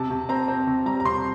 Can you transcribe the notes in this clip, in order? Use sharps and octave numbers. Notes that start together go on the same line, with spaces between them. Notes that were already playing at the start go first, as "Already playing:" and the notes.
Already playing: C3 A5
C3
C4 A#5
C4
C3
G3 A#5
A#5
C3 C6